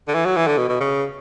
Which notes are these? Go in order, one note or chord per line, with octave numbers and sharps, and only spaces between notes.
D3
E3
F#3
E3
D3
B2
B2
C#3